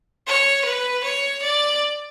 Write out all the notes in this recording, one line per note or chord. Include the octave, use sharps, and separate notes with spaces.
C#5
B4
C#5
D5